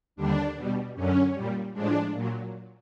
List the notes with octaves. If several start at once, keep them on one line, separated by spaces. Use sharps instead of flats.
D#2 D3 G3 D4
B2 G3
F#2 D3 F#3 C#4
A#2 G3
A2 F3 G#3 D4
A#2 F#3